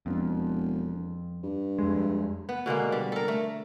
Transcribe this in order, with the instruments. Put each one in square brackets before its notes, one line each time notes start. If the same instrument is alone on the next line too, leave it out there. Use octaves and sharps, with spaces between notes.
[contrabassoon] E1 [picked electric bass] F2
[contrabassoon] G2
[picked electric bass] F2 G#3
[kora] B3
B2 D3 G#3 A#3
G3
A4 A#4
A3